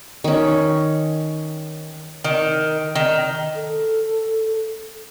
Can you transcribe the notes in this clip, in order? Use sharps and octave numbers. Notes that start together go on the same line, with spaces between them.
D#3 C#4
D#3
D#3
A4